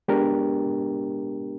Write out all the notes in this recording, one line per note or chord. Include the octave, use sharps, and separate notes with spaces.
G#3 B3 D4 G4 A#4